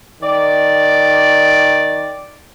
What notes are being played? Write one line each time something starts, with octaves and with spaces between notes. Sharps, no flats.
D#3 D5